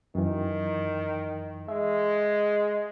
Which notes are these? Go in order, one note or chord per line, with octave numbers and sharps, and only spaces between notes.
F#2 D#3 E3
G#3 E5